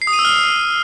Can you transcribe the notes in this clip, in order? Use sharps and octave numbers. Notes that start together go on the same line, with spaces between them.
C7
D#6
D#7
E6
F6